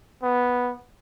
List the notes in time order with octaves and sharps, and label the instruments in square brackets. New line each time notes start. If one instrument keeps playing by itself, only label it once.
[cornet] B3